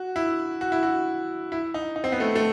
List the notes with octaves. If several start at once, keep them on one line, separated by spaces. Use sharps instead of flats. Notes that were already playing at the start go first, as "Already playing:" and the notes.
Already playing: F#4
E4
F#4
E4
F#4
E4
D#4
D#4
C4
B3
A3
A3